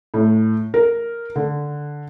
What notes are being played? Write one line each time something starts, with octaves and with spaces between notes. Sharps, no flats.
A2
A#4
D3